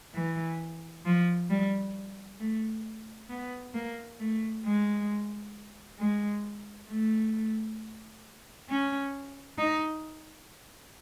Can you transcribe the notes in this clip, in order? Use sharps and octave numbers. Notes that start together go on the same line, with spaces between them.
E3
F3
G3
A3
B3
A#3
A3
G#3
G#3
A3
C#4
D#4